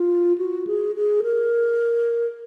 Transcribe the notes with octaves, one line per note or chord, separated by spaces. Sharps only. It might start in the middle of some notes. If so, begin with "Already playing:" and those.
Already playing: F4
F#4
G#4
G#4
A#4